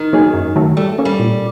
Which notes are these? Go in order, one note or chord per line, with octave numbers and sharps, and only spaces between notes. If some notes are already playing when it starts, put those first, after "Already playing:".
Already playing: D#3
F#3 A#3 D#4 G#4
F#2
D#3 F#3 A3
G3 A3
A#3 C#4
G3
A#2